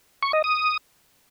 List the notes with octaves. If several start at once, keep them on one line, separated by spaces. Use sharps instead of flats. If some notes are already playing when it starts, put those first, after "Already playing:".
C#6
D#5
D#6